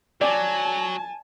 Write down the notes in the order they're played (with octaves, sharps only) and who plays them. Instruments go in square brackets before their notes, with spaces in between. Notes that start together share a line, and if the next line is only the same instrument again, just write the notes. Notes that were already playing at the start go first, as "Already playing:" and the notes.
[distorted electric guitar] F#3 [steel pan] D5 [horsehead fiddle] G#5 A5